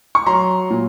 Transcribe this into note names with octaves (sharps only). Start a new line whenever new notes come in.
C#6
F#3 A#5 C6
A#2